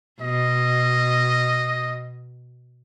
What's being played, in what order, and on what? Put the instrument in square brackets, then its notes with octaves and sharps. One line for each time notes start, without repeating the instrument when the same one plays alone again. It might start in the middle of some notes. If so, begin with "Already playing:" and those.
[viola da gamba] B2 [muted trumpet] D#5